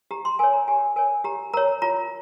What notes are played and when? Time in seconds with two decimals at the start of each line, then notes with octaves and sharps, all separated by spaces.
0.11 G4 A#5
0.25 C6
0.39 A#4 C#5 G#5
0.53 A#5
0.68 G4 G#5
0.96 A#4 C#5 G#5
1.24 G4 A#5
1.53 A#4 C#5 A#5
1.82 F4 A#5